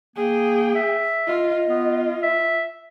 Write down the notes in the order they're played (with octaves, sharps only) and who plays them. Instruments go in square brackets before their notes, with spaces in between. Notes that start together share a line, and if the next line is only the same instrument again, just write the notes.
[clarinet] A#3 [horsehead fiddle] G#4 G5
[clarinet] E5
[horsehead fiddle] F4 [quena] D#5
[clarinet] B3 [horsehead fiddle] F4
[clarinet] E5